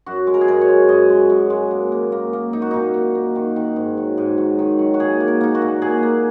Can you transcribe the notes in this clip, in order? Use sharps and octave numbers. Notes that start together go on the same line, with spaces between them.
F#2 F#4
G#3
A#4
G#4
F#2 A#4
C#5
G#3
F#2 D#5
G#3
F#2
G#3
A#3
A#3
A#3
A#3
A#3 D#4
F#4
A#2 D#4
A#3
A#3
D#3
D#3
G#2
F#3
G#2
F#3
D#3
F#3
F#4
A#2 G#4
A#3
A#4
A#3 D#4
F#4
A#2
A#2 G#4
A#3